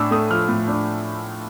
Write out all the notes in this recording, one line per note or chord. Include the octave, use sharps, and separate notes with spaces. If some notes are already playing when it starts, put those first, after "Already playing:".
Already playing: A2 D4 E6
A3 D#6
F3 F6
A2
D4